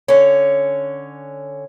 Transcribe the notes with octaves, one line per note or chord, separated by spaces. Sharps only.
D3 C#4